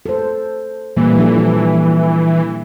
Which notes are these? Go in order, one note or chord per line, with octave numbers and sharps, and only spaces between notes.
A4 C5
A#2 E3 G3 A#3
F3 D4 A4